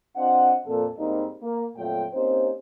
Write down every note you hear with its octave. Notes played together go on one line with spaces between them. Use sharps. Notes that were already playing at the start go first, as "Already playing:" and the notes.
C4 D4 F4 C5 D#5 F#5
F2 A#2 A4
G#2 G3 A#3 C4 D#4
A#3
F2 A#2 F#3 A3 F4 G5
A#3 C4 C#4 D#4 G4 C5